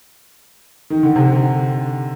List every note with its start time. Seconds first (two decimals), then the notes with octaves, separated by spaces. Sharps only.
0.90 D#3
1.03 D3
1.16 C3
1.29 D3